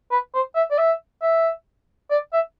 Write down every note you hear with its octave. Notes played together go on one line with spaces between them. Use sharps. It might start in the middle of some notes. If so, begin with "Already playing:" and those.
B4
C5
E5
D5
E5
E5
D5
E5